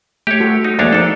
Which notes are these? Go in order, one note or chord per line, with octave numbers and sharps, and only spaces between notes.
A3 G4 C#5
G3 F#4 A4
D#4
D2 F3 G#3 A#3 D4 C#5
D4 D#4 A4